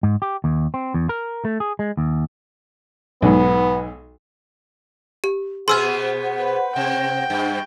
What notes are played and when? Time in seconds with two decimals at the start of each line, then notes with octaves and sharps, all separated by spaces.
0.03 G#2
0.22 G4
0.44 D#2
0.74 C4
0.94 E2
1.09 A#4
1.45 A3
1.60 G#4
1.79 G#3
1.97 D#2
3.22 B1 G#2 B3
5.24 G4
5.68 B2 B3 G#4 C5 F#5 C6 E6 F6
6.37 B4
6.76 C3 G5
7.30 G2